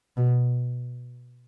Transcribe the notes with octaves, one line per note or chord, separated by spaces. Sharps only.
B2